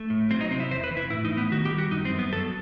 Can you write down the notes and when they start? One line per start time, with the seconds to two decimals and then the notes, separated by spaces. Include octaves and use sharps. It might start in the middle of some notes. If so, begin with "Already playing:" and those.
Already playing: A3
0.10 A2
0.30 F#3 C4
0.41 D#4
0.50 C3 C4
0.60 E4
0.71 E2 C5
0.84 B4
0.91 E3
0.97 E4
1.10 A2 E4
1.25 D#4
1.32 A2
1.37 B3
1.52 D#3 F#4
1.65 G4
1.72 G3
1.78 F#4
1.91 F#2 D#4
2.05 C4
2.12 F#2
2.19 B3
2.32 F#3 A4